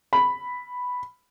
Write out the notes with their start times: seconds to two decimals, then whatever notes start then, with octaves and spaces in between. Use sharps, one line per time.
0.13 B5